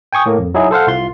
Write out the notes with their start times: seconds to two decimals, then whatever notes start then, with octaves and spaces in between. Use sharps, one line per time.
0.13 G5 G#5 C#6 D#6
0.26 A2 A#3
0.39 F2
0.54 F#3 D#4 E4 G#4
0.71 A4 C5 F5 F#5
0.87 C2 F4 C6